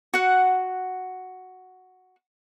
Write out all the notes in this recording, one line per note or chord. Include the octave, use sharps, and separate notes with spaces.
F#4 F#5